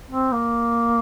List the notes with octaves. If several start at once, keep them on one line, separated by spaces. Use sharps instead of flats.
C4
A#3